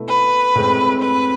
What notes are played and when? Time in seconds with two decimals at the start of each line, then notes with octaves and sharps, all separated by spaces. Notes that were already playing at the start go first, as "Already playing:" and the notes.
Already playing: B2 A3 E4
0.08 B4
0.55 A2 G#3 C4
1.02 B4